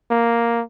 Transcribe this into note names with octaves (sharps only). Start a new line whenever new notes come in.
A#3